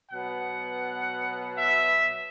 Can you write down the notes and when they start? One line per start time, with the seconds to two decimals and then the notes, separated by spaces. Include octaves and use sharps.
0.11 B2 F#3 B3 F#5
1.58 E5